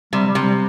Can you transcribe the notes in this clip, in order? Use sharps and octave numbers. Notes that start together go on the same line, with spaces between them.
C3 G3
G3
C3
G3